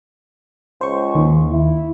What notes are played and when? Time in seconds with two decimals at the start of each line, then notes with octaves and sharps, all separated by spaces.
0.81 C#2 C5 C#6
1.15 D#2 D#3
1.52 E4